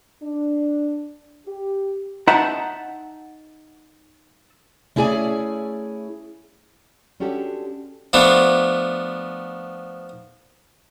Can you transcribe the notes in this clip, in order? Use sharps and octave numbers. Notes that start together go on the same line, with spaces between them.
D4
G4
D#4 E5 F#5 A5 A#5
A3 C#4 E4 G#4 D5 G#5
G#3 C#4 D4 F#4 G4 A4
F3 A3 B3 D4